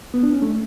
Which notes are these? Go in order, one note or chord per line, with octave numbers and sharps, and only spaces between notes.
B3
D4
C#4
A3